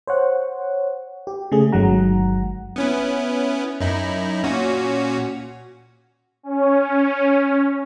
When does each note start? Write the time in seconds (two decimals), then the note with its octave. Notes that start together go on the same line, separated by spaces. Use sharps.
0.07 C5 C#5 F#5
1.27 G4
1.52 C#3 A3 G#4
1.72 G1 D#3 F#3 G#3 F#5 A#5
2.76 B3 C#4 E4
3.81 F#2 D#4 E4
4.43 A#2 C#4 F#4
6.43 C#4